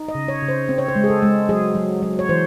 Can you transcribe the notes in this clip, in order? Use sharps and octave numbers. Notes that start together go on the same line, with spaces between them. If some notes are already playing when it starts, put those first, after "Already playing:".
Already playing: D#4
D#5
C#3
C#5
C#3
C5
C4
C#5
C5
G#3
G#4
A4
G#3
F#3 G#4
F#3
F#3
C#5
E3 C5